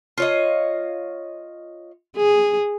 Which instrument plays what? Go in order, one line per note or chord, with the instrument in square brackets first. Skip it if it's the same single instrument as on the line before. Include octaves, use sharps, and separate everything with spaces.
[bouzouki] F4 C#5 D#5
[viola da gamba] G#4